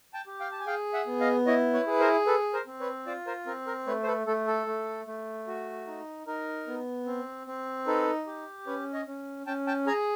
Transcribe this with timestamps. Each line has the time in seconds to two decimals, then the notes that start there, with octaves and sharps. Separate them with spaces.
0.14 G5 A5
0.27 G4
0.40 F5 G5
0.52 A5
0.60 G#5
0.67 G#4 F5 G5
0.93 E5 F#5
1.07 B3
1.20 D#5 F5
1.47 E4 C#5 D#5
1.74 B4 C#5
1.87 G#4 B4
2.00 A#4 C5
2.27 A4 B4
2.54 A#4 C5
2.67 C4
2.80 B4 C#5
3.06 F4 C5 D5
3.27 A#4 C5
3.47 C4 A#4
3.67 A#4
3.87 A3 B4 C#5
4.03 C5
4.07 A4 B4
4.27 A3 A4
4.47 A4
4.67 A3
5.07 A3
5.47 F#4
5.87 D#4
6.27 D#4 A#4
6.67 B3
7.06 C4
7.47 C4
7.86 D#4 A4 B4
8.27 G4
8.67 C#4 B4 C#5
8.93 C#5 D#5
9.07 C#4
9.47 C#4 G5 A5
9.67 G5 A5
9.87 G#4 G#5 A#5